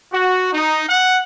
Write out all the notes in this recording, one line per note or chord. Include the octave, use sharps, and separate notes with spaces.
F#4
D#4
F#5